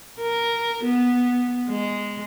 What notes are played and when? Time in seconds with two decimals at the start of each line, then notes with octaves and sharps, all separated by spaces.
0.20 A#4
0.84 B3
1.68 G#3